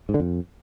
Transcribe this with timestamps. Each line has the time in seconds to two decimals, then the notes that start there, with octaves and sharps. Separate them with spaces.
0.09 G#2
0.14 D3
0.20 F2